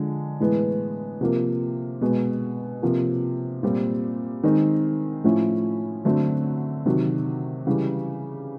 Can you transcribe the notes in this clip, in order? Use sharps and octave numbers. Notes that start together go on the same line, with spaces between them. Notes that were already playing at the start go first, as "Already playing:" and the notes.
Already playing: D3 F3 G#3
A2 E3 G#3 B3
C3 F3 A#3
B2 G#3 B3
C3 F3 A#3
A#2 G3 C4
D#3 G#3 C4 D#4
A2 F3 A3 C#4 E4
D3 F#3 A3 C4
C3 D#3 F#3
C#3 E3 G3